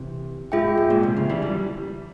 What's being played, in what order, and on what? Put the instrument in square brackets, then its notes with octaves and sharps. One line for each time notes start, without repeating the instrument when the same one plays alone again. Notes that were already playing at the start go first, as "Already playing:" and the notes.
Already playing: [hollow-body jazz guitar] C3 E3
[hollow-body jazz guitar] G#2 [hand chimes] F4 G#4 E5 G5
[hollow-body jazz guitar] G#2
A#2
G#2 C3
C#3 F3
E3 G3
E3 G3